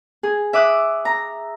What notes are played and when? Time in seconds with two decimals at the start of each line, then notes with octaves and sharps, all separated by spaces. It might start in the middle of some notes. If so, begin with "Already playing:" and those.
0.23 G#4
0.53 E5 D6 D#6 F#6
1.05 A#5